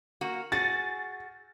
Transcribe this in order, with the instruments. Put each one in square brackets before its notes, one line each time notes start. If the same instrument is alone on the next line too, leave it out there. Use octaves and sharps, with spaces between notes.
[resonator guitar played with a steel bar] A#3 F#4
[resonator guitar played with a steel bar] F#4 G#4 [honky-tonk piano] A6